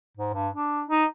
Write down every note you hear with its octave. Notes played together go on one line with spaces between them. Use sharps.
G#2
G2
D4
D#4